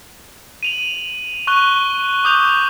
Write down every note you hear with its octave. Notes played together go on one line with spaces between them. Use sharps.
D#7 F7 F#7
C#6 F#6 G7
D6 D#6 G6 F7